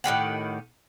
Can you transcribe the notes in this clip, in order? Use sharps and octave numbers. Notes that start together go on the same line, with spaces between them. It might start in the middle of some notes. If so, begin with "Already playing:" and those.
A2 D#3 G4 F#5